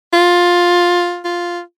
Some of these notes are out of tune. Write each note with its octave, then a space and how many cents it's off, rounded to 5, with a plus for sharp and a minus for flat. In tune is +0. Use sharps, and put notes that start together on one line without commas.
F4 +10
F4 +0